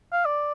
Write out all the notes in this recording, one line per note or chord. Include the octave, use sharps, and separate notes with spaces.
F5
D5